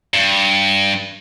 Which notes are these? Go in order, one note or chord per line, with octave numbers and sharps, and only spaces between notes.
G2